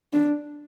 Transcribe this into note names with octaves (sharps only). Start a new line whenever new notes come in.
D4